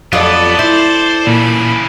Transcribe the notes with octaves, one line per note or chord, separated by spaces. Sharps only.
F2 F#3 B3 F4 A4 D5
E4 C5
A#2 C#3 E3 B5